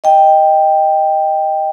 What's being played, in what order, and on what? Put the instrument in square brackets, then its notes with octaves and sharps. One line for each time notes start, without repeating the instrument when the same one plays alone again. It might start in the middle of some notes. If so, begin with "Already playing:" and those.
[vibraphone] D#5 G5